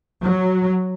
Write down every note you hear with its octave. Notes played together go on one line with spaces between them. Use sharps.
F#3